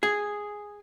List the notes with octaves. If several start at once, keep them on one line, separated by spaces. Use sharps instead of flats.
G#4